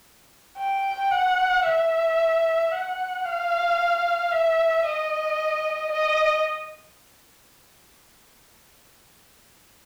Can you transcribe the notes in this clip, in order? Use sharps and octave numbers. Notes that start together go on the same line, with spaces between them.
G5
F#5
E5
F#5
F5
E5
D#5
D#5